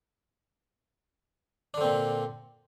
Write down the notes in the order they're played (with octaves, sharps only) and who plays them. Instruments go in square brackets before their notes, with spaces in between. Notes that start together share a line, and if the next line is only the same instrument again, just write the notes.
[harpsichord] D4
D3
C4
A#2